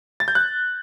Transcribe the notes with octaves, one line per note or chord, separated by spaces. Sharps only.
A6
G6
F#6